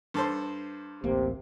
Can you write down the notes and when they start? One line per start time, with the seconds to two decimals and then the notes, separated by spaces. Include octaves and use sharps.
0.14 G2 A4 C5
1.04 D1 A1 C3 A#3